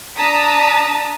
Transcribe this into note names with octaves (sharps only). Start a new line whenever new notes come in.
D4 A5 A#5 D#6 B6